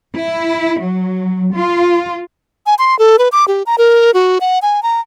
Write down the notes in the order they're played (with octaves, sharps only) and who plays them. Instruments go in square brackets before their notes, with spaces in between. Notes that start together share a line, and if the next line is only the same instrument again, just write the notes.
[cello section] E4
F#3
F4
[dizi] G#5
C6
A4
B4
D6
G4
A#5
A#4
F#4
F#5
G#5
A#5